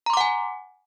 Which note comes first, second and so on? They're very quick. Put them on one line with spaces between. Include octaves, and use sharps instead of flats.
A#5 C6 D6 F#5 G#5